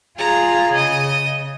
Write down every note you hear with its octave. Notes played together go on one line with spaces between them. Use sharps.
F4 G#4 A#5
C#3 D#5 D#6